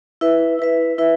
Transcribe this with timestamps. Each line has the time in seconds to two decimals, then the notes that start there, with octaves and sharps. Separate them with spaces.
0.21 E4 B4 E5
0.59 E4 B4 E5
0.98 E4 B4 E5